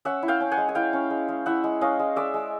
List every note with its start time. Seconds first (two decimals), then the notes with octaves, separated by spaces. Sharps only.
0.05 C#4 E5 F#5
0.23 E4
0.28 F5 G5
0.40 C#4
0.51 F#5 G#5
0.57 G#3
0.69 G#5
0.75 E4 F5 G5
0.93 C#4
1.10 G#3
1.29 G#3
1.46 E4 E5 F#5
1.64 G#3
1.81 C#4 D#5 F5
1.99 G#3
2.16 G#3 D5 E5
2.34 G#3